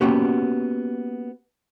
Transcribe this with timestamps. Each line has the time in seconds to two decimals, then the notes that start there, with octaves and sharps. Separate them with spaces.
0.01 A#3 B3 C#4 F#4 G4